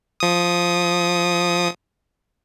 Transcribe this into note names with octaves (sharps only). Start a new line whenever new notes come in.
F3 D#6